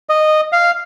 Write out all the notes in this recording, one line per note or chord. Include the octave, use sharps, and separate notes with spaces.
D#5
F5